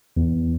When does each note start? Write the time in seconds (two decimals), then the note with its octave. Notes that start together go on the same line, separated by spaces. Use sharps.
0.17 E2